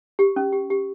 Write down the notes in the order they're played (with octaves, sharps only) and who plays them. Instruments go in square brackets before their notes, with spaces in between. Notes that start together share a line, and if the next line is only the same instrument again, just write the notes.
[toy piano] G4
C#4
G4
G4